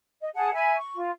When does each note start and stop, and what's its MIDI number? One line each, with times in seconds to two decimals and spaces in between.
0.21 0.29 75
0.35 0.53 68
0.35 0.53 78
0.35 0.53 81
0.53 0.75 76
0.53 0.75 80
0.53 0.75 83
0.75 0.95 85
0.95 1.11 65